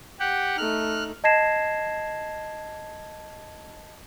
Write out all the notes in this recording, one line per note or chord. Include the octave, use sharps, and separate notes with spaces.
G4 F#5
A3 D#4 F6 F#6
D#5 A5 G#6 A#6 C7 E7